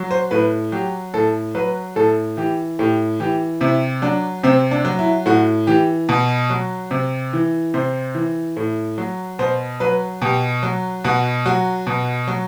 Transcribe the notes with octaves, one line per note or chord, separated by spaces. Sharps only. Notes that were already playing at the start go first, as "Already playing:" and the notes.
Already playing: F#3
C5
A2 B4
F#3 G4
A2 A4
F#3 B4
A2 A4
E3 G4
A2 G4
E3 G4
C3 E4
F#3 D4
C3 C4
D4
F#3
E4
A2 F#4
E3 G4
B2
F#3
C3
E3
C3 C5
E3
A2
F#3
B2 C5
F#3 B4
B2 G4
F#3
B2 F#4
F#3 F#4
B2
F#3